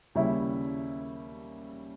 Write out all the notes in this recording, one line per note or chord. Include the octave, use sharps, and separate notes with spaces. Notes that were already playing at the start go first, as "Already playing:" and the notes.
D#2 C#3 G3 C#4 E4